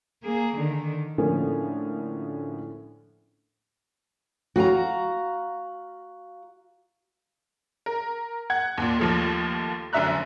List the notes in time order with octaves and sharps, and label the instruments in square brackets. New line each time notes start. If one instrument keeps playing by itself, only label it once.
[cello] A#3 G#4
D3 D#3
[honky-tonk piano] A2 D3 F3 A#3 C#4
[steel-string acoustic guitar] F#4 F5 G#5 A#5
[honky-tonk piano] A#4
F#5 G#6
D#2 A#2
D#2 F3 A3
F1 F#2 D3 E5 A#5 F#6